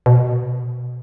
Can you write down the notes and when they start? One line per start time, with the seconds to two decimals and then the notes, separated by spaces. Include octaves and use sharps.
0.06 B2